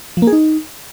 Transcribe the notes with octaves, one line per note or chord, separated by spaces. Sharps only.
F3
A#3
G#4
D#4